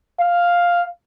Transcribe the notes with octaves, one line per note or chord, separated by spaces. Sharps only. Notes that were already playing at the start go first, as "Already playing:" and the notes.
F5